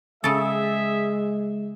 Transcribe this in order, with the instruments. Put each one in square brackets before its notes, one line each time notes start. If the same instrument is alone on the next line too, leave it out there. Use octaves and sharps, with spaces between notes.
[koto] C#3 A4 [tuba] G#3 [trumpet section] G#4 E5